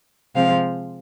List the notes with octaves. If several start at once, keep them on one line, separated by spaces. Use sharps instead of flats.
C3 F3 G#3 C4 F5